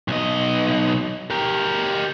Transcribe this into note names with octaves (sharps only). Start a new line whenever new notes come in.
B1 D#5
G4 A#4